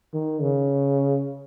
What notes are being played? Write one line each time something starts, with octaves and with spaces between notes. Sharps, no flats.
D#3
C#3